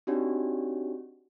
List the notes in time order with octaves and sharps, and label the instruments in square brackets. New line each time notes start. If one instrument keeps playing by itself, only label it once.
[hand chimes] C4 D4 D#4 F#4 G4 C#5